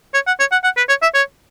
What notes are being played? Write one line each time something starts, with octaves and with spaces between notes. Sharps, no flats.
C#5
F#5
C#5
F#5
F#5
B4
C#5
E5
C#5